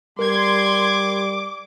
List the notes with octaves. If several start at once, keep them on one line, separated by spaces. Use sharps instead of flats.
G3 A#4 C6 D6 G#6